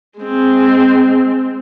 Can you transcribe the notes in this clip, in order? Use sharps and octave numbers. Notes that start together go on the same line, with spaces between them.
G#3 C4